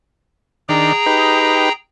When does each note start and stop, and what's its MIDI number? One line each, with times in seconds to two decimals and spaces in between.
0.69 0.93 51
0.69 0.93 62
0.69 1.72 68
0.69 1.72 79
0.69 1.72 82
1.06 1.69 63
1.06 1.69 67
1.06 1.69 71